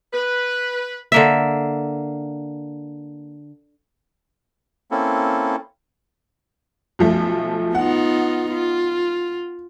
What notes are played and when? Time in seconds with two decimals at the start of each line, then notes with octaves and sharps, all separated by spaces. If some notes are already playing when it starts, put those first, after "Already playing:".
0.13 B4
1.12 D3 A#3 E5
4.91 A#3 C4 C#4 E4 A4
6.99 B1 F3 A3
7.75 B3 D#4 F4 F#5
8.52 F4